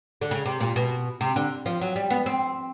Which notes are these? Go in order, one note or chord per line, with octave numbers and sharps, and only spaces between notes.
D3
C#3
C3
A#2
B2
C3
D3
F3
F#3
G3
B3
C4